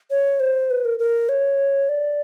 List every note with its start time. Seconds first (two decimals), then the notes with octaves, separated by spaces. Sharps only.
0.11 C#5
0.40 C5
0.71 B4
0.85 A#4
0.99 A#4
1.29 C#5
1.89 D5